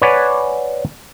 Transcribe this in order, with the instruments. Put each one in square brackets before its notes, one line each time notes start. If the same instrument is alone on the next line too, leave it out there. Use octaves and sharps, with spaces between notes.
[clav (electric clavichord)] B4 C#5 D5 F#5 G#5